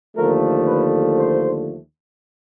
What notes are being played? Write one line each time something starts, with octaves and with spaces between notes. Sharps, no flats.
D#2 D3 F3 A3 A#4
B4
C5